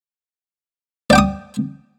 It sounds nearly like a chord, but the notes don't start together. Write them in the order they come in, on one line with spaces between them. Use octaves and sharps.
D5 G5 D6 D#6